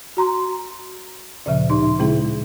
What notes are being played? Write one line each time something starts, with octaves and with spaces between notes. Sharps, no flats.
F#4 A#5 C6
D2 A#2 C#3 F3 E5
A2 D#4 C6
A#2 C#3 G#3 C4 E4 G#4